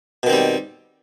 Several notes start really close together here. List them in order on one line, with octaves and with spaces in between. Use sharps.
B2 D#3 C4 G3